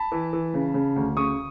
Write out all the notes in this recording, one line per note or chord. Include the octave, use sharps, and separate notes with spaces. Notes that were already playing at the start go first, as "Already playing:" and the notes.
Already playing: A5 B5
E3
E3
C#3
C#3
D2
C#3 C#6 D#6